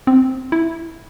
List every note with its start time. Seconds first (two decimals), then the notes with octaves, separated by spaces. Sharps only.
0.07 C4
0.52 E4